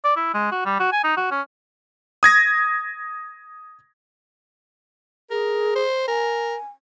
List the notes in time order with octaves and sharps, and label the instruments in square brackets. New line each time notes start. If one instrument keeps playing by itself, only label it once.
[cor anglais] D5
E4
G#3
F#4
G3
F#4
G#5
D#4
F#4
C#4
[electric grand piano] D#6 G#6 A#6
[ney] G#4 [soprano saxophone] A#4
[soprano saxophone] C5
[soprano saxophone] A#4 [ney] G#5